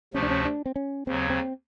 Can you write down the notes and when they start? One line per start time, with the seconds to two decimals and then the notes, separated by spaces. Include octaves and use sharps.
0.14 D2 C3 F3 A3 C#4
0.23 D4
0.30 C#4
0.45 D4
0.66 C4
0.76 C#4
1.07 D#2 C#3 F#3 C4
1.30 C4